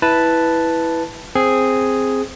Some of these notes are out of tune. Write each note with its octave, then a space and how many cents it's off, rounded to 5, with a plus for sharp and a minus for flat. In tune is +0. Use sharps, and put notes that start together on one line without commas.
E4 -5 B4 +0 A5 +0
C4 +0 G#4 +0